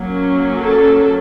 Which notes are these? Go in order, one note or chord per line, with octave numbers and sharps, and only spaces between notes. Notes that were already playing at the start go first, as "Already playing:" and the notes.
Already playing: F#3 A#3 C#4
A4